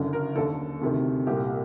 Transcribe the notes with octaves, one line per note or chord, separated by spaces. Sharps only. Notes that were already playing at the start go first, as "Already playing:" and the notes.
Already playing: F#1 F#2 D3
A#4
D#2 D3 A4
D2 C3 D#3
C2 A#2 G4